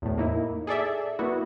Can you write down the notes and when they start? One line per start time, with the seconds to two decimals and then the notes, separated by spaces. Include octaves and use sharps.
0.02 E2 A2
0.18 A#3 D#4 E4
0.67 G#4 A4 D5 E5
1.19 A#3 B3 E4 F#4